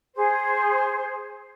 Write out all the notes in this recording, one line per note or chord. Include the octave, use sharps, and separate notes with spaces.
G#4 C5